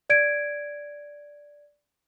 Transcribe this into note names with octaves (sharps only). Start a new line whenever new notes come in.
D5 G#6 D7